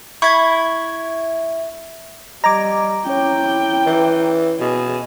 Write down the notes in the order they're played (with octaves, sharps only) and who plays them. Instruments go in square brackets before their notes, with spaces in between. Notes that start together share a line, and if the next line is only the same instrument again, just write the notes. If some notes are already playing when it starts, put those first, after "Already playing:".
[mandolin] E4 [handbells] C#6 G#6
[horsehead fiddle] G3 [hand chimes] D#5 G#6 [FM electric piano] A#5 D6
[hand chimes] C#4 C#5 [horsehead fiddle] E4 G5
[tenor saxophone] E3
[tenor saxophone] B2 [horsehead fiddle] G#4